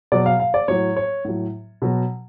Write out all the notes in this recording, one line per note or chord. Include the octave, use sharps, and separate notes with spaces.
B2 F#3 D5
F5
F5
D5
A2 F#3 C#5
C#5
A2 F#3
B2 F#3